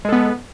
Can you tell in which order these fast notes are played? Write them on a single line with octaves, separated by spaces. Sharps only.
G#3 A4 B3